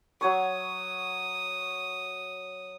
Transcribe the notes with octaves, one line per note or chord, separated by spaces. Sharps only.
F#3 C#5 C#6 D#6